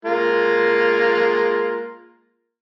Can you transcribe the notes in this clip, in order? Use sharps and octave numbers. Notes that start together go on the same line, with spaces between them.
G#3 A#3 F4